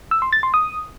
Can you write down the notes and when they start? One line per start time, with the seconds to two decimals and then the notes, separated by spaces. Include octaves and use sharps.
0.11 E6
0.22 C6
0.33 A6
0.43 C6
0.54 D#6